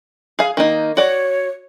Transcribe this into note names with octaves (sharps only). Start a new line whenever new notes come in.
G#4 F5
D#3 A#3 D#4
F#4 C#5 D5